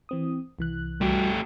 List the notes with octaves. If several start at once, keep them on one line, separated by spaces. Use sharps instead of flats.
E3 C4 D#6
C2 E3 F#6
G3 A3 F#4 G4